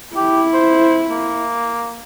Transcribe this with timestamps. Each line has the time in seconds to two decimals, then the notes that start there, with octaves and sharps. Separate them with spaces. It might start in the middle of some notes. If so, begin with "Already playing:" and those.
0.16 E4 G4
0.54 C5
1.10 A#3